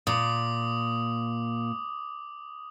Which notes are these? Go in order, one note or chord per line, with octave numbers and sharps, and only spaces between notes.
A#2 D6 D#6